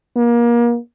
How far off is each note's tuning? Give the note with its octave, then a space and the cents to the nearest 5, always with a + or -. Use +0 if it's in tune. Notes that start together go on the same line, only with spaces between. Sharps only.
A#3 +30